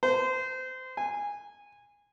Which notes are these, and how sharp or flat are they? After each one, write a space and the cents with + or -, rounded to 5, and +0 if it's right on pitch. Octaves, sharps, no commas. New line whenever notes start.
C5 -25
G#5 -15